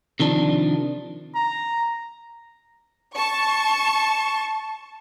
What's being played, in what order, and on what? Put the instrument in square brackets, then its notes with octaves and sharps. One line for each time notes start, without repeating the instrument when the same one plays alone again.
[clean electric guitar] C3 D#3 F3 D4
[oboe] A#5
[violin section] A5 C#6